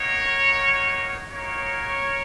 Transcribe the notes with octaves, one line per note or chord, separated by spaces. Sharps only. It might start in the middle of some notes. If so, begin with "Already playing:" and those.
Already playing: A#3 D#4 F#4 A#4 C#5
A#3 D#4 F#4
A#3 D#4 F#4 A#4 C#5